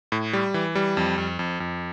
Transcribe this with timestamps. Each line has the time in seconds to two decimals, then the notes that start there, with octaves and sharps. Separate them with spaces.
0.12 A2
0.33 G3
0.54 E3
0.75 G3
0.97 F2
1.18 F2
1.39 F2
1.60 F2